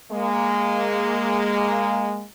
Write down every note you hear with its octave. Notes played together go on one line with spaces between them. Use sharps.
G#3 A#3